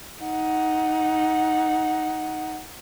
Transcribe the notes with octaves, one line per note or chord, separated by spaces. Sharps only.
D#4 F#5